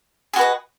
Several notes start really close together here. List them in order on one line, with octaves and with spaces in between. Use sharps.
G#4 F#4 B4 D#5